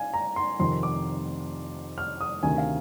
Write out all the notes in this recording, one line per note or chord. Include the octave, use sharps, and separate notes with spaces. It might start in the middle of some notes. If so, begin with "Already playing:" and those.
Already playing: F5 G#5
A#5
C6
F2 C3 D#3 C6
D6
F6
D#6
D2 C3 D#3 G#5
F5